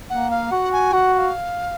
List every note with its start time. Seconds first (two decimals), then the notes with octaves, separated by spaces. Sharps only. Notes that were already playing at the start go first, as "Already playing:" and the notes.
0.10 A#3 F#5
0.31 F5
0.51 F#4 F#5
0.72 G#5
0.93 F#4 F#5
1.14 F#5
1.18 F5